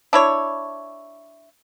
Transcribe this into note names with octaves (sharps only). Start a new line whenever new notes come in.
D4 E4 C#5